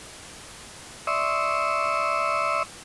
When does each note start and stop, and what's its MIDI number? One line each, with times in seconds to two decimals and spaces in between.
1.07 2.63 74
1.07 2.63 76
1.07 2.63 84
1.07 2.63 85
1.07 2.63 87
1.07 2.63 88